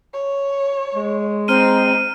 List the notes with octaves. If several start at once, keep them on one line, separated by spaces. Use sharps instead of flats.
C#5
G#3
C4 D#4 F6 D#7